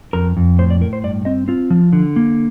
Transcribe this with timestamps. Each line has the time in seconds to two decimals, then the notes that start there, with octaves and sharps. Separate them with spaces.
0.13 F2 A#4
0.37 F2
0.59 A2 C5
0.70 D5
0.81 A2 A#4
0.93 C5
1.04 G2 D5
1.25 C4 D#5
1.48 C4 F4
1.70 F3
1.93 D3
2.16 A#3